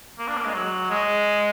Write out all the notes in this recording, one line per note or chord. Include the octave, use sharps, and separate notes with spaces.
A#3
D4
A#3
G#3
F#3
G#3